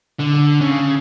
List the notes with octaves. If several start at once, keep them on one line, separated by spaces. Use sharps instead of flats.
D3
C#3